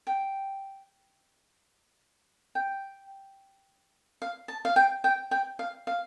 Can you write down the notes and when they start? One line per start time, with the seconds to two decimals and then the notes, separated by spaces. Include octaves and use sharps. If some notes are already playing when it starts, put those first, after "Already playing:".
0.07 G5
2.55 G5
4.22 F5
4.48 A5
4.65 F5
4.76 G5
5.04 G5
5.31 G5
5.59 F5
5.87 F5